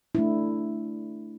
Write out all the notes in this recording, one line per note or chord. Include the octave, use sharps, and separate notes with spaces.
A3 D4 E4